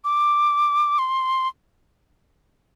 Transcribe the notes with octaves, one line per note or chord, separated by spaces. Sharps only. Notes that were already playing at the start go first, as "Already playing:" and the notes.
D6
C6